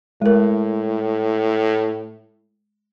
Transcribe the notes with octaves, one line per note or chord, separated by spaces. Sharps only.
A2 G#3 A#4